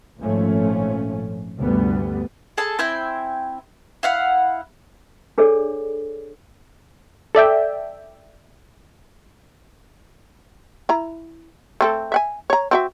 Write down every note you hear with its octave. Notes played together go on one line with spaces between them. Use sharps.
G#1 A#2 F3 A3 C#4
D2 G2 C3 G3 B3
G#4 A4 A5
C4 E4 G5 G#5
E4 F5 F#5
D4 G#4 A4 C#5 D5
A4 D5 E5 G5
E4 A#5
A3 C4 A4
E5 F#5 G#5
C#5 A#5
C4 F#4 E5